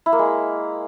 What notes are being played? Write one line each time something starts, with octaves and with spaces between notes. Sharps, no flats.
E4
A#3
G#3
E4